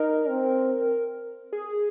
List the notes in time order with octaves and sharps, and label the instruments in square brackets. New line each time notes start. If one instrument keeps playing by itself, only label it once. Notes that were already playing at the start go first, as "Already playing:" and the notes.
Already playing: [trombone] D#4 [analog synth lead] A#4
[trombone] C4
[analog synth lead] G#4